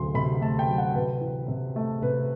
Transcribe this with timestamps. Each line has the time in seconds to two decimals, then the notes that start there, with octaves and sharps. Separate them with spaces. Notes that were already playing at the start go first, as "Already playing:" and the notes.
Already playing: D2 C3 F#3 C6
0.14 C3 B5
0.41 A3 A5
0.59 G5
0.68 F#3
0.78 F#5
0.95 C3 B4
1.21 E3
1.48 C3
1.76 A3
2.02 C3 B4